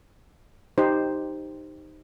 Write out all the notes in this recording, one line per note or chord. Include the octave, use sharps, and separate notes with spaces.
D#4 G4 C5